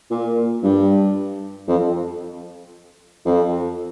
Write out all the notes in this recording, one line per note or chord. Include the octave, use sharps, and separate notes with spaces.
A#2
G2
F2
F2